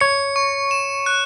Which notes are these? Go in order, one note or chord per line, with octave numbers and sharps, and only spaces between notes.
C#5 C#7
C#6
E7
F#6